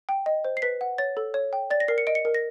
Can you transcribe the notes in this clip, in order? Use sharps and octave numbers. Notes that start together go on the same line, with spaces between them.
G5
D#5
C5
C7
B4 B6
F#5
C#5 A6
A4
C#5
G5
D5 A6
A#6
A#4 C7
C#7
D#5 D7
C#7
A#4
A#6